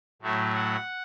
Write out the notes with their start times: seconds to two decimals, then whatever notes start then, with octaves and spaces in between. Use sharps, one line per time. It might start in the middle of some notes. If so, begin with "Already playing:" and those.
0.22 A2 F#3 A3
0.55 F#5